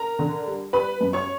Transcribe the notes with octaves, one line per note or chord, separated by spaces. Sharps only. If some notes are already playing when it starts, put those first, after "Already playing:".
Already playing: A#4 A#5
D3
G3
G3 B4 B5
F#2
C#5 C#6